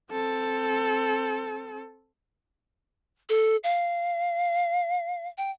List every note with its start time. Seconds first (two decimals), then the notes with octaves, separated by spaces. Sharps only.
0.11 C4 A4
3.29 A4
3.64 F5
5.38 G5